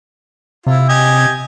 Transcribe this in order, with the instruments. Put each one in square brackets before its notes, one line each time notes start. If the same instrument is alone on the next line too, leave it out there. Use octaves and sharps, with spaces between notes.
[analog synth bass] C3 [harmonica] E4 F4
[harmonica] G4 D#5 G#5